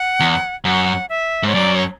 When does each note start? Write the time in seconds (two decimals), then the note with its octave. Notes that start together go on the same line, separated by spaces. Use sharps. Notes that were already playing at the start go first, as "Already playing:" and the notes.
Already playing: F#5
0.20 E2
0.65 F#2 F#5
1.09 E5
1.43 G#2 C#5
1.54 F#2 D5
1.76 C#5